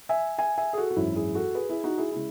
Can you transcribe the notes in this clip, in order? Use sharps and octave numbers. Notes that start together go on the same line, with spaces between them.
E5 G#5
E5 G#5
E5 G#5
G#4
F#4 A4
F#4
G#1 F#2 E3 E4
E4 G#4
F#4 A4
G#4 B4
E4 G#4
D#4 F#4
E4 G#4
C#3 G#3 E4